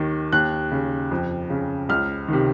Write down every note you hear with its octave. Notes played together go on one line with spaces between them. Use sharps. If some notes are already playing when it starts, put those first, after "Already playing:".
Already playing: D#2 D#3
D#2 F#6
C#3
F2
C#3
C#2 F6
C3 D#3